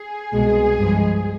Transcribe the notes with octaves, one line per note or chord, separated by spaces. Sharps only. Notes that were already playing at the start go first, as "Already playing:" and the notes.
Already playing: G#4
C2 B2 G#3
G2 F3 G#3